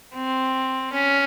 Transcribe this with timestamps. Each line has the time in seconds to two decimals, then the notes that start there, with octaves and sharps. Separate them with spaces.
0.15 C4
0.93 C#4